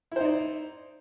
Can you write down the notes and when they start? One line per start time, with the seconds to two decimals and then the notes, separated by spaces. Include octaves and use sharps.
0.12 E4
0.16 C5
0.20 D#4
0.25 D5